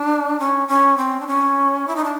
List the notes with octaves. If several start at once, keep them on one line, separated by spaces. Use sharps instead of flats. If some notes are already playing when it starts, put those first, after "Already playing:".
Already playing: D4
C#4
C#4
C4
D4
C#4
E4
D#4
D4